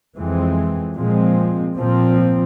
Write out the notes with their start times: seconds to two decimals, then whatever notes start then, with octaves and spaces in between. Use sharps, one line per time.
0.16 F2 E3 G#3 C4
0.95 A#2 F3 G#3 C4
1.76 A#2 F3 C4